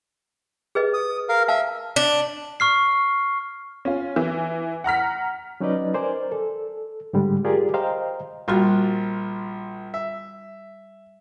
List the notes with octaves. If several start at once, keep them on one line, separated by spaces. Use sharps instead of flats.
G#4 B4 D#5
D#6
A#4 F5
E5 F5 A5
D4
C#6 F6 C7
C#4 F4
E3
F#5 A#5 F6 B6
F#3 C#4 D#4 B4 D5 D#5
A#4 C5 D5 G#5
A4
G#2 D3 G3 G#3
F4 G4 G#4 A#4 D5
C5 D#5 F5 G5 A#5
A#1 G3 F4 F#4 F6
E5